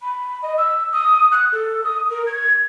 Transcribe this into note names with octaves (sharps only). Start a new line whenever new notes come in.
B5
D#5
E6
D#6
F#6
A4
D#6
A#4
G#6